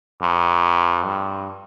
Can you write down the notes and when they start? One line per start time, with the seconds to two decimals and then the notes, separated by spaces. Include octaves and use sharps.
0.22 F2
1.06 G2